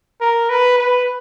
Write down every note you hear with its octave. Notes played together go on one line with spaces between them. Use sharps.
A#4
B4
B4